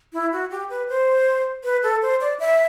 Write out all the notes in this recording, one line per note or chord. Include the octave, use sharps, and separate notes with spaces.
E4
F#4
G4
B4
C5
B4
A4
C5
D5
E5